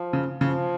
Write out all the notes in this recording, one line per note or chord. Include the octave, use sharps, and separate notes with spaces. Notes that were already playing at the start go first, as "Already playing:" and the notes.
Already playing: F3
C#3
C#3 F3